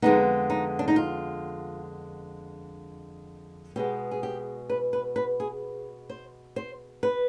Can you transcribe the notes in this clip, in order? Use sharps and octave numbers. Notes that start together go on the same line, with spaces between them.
F2 D3 G#3 B3 D#4
D#4
D4
D#4
F4
B2 G#3 B3 G4
G#4
G4
B4
B4
B4
G#4
C5
C5
B4